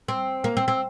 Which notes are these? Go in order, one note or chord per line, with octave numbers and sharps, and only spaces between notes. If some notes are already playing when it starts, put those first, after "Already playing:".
C4
A#3
C4
C4